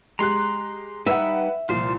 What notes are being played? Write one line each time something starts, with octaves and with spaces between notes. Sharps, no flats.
G#3 G4 A#5 C6 F#6
G3 D#4 B4 E5 F#5
C2 A#2 F3 F4 C5